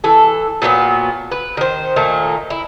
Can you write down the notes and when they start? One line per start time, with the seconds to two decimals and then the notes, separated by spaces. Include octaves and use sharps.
0.04 E3 A4
0.62 A#2 F#3 A3 B3
1.31 B4
1.57 D#3 C5
1.96 A#2 D#3 A3 A#3
2.50 E4